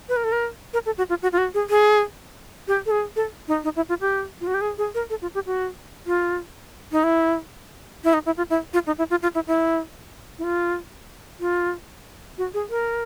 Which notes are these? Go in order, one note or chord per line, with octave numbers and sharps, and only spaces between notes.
B4
A#4
A4
A#4
A#4
A4
F#4
F4
F#4
F4
F#4
G#4
G#4
G4
A4
G#4
A4
D#4
D#4
E4
F4
G4
F4
F#4
G4
G#4
G#4
A#4
A4
F4
G4
F#4
F4
D#4
E4
E4
D#4
E4
F4
E4
F4
D#4
E4
F4
F4
E4
E4
E4
F4
F4
F#4
G#4
A#4